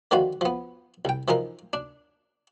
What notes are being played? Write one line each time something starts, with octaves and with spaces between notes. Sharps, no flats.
D3 D#3 F3 F4 F#4
F3 B3
C2 G5
E3 F3 D#4 A#4
D4